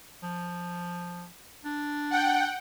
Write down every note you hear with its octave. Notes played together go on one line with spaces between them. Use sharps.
F3
D4
F#5 G5